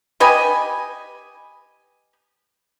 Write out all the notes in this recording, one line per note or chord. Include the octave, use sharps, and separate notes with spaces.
G4 B4 D#5 G#5